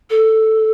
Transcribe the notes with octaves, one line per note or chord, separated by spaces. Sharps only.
A4